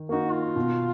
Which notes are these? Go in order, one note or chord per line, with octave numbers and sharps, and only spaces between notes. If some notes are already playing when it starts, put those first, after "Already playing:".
Already playing: D#3
A#3 D#4 F#4
F4
B2